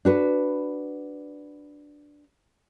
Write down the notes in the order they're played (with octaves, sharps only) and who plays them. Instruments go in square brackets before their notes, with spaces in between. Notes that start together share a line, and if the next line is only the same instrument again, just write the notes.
[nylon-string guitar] D4 F#4 B4